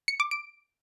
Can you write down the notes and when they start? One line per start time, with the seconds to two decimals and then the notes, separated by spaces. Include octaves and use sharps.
0.08 C#7
0.20 D6
0.31 D7